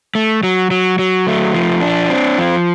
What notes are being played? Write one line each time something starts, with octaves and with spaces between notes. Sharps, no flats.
A3
F#3
F#3
F#3
A3
F3
D4
C4
F3